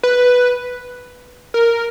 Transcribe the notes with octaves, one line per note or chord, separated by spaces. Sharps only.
B4
A#4